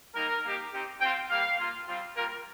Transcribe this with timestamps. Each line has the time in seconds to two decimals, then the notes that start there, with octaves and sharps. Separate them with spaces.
0.14 G3 A#3 D#4 A#4
0.44 A#3 D#4 G4
0.72 C4 D#4 G4
1.00 C4 F4 G5
1.29 G3 A#3 G4 F5
1.58 A#3 F4
1.88 G3 C4 F4
2.16 G3 A#3 F4 A#4